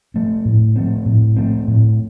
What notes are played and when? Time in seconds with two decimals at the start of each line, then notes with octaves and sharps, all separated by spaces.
0.14 F3 A3 C4
0.45 A2
0.76 F3 A3 C4
1.06 A2
1.36 F3 A3 C4
1.68 A2